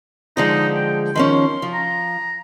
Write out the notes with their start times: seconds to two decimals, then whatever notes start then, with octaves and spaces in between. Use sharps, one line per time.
0.37 D3 F3 G#3 D#4
0.76 G5
1.15 D#3 F3 C#4 C6
1.62 F3
1.74 A#5